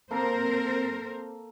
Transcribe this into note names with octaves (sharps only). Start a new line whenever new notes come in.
A#3 C4 A4 A#4 C5